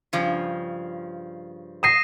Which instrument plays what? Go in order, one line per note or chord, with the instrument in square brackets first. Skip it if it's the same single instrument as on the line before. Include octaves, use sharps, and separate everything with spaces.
[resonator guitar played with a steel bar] G2 C#3 F3
[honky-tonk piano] D#6 C7 [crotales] A#6 D#7 E7